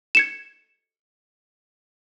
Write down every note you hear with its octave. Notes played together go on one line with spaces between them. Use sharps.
G#6 C#7 E7